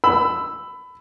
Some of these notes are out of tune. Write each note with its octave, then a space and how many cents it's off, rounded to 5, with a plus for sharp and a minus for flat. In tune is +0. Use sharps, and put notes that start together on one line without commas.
B5 +20 E6 +0